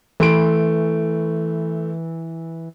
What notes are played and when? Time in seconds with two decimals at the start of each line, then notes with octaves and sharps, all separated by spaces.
0.20 E3 A3 C6 D7